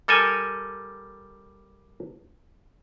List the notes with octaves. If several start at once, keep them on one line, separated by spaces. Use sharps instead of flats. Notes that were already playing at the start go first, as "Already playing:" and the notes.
G3 A4 A#4 G#5